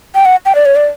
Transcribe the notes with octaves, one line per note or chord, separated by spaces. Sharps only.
G5
F#5
G5
D5
C#5
D5